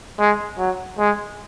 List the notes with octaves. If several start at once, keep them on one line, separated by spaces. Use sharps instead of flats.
G#3
F#3
G#3